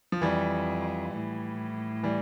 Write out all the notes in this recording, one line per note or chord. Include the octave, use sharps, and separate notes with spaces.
F3
F2 E3 G3
A2
E3 G3